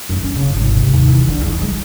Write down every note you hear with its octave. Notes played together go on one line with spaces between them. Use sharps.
F#2
C#4
C#3
G#1
C3
D#2
E3
D3
E2
G#3